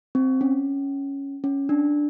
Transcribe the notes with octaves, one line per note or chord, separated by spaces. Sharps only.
C4
C#4
C#4
D4